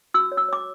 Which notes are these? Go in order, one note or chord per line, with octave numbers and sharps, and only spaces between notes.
F#4 E6
C#5
E6
C#5 D6